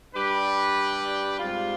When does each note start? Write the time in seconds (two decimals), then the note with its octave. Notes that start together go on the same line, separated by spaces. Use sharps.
0.15 G3 D4 G4 B4
1.40 G#2 G3 C4 F4